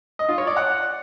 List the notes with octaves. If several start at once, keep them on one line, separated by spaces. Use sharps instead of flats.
D#5
F4
C#5
D5
F#5